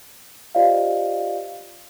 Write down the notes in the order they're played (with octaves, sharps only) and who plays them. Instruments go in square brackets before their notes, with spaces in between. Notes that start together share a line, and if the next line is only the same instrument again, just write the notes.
[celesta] F4 G4 C5 D5 D#5 F5